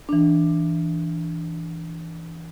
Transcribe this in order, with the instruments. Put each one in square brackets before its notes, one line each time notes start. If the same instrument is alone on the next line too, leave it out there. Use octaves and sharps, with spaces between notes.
[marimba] E3 D4